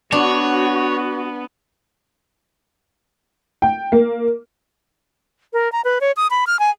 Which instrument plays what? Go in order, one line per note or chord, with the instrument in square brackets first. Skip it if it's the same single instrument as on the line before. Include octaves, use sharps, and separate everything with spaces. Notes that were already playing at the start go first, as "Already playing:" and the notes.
[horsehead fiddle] B3 [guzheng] D4 [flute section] F#4 [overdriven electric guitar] C#5
[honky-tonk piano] G5
A#3
[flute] A#4
A#5
B4
C#5
D#6
B5
F6
G#5